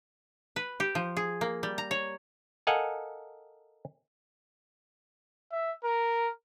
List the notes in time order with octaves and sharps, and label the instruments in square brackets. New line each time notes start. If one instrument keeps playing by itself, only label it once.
[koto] B4
G4
F3
G#4
A#3
G3
A#5
C#5
[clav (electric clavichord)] A4 A#4 D#5 F5 F#5 G#5
[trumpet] E5
A#4